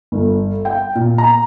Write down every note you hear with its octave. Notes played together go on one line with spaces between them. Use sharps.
G1
G5
A#2
A#5